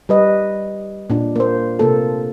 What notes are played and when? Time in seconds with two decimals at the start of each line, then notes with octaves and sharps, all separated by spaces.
0.09 G3 B4 D#5
1.10 A#2 D4
1.36 A#3 C5
1.79 C3 A#3 A4